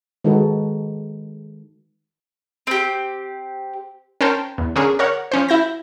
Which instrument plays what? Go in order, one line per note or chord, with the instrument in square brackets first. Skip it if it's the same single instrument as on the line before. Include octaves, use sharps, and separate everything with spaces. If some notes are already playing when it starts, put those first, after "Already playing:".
[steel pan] D#3 G#3 D#4 F#4 A4 B4
[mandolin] C4 G4
[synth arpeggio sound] C#4 A#4 C5 G5 A5
E2
D3 C#4 G#4 A#4
A#4 C#5 F#5
F3 C#4 C5
E4 G6 A#6